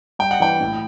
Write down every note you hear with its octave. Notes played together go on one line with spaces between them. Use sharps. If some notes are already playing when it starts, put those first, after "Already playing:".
G2 G5
F#5
E3 G5
A2